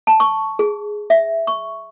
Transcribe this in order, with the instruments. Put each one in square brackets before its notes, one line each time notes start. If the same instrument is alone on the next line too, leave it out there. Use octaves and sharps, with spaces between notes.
[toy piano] A5
C#6
G#4
E5
C#6